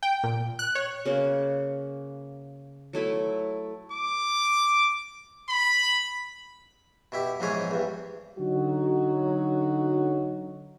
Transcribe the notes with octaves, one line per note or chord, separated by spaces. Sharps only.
G5
A#2
F#6
C#5
C#3 A#3 F#4
F#3 A3 E4
D6
B5
B2 E4 G4
A#1 E2 G#2 E3 G#4 C#5
E2 G2
D3 F#3 D#4 F#4